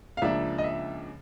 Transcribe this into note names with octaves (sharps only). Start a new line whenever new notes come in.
F5
C#2 C#3 F3 A#3 D4 E5
D#5
E5